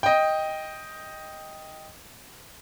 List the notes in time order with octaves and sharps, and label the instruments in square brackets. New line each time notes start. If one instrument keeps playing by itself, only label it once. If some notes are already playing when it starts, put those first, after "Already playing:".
[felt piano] D#5 G5